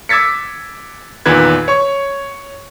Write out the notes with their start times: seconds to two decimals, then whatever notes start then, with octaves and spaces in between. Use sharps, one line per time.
0.09 D6 E6 G#6 A6 B6 C#7
1.26 E2 A#2 D#3 B4 G#6
1.68 C#5 C#6